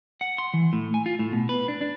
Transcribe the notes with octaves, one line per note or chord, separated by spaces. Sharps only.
F#5
C6
E3
A2
G#5
F4
A2
B2
B4
D4
D4